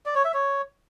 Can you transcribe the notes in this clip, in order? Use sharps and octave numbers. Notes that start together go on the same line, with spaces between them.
D5
C#5
E5
C#5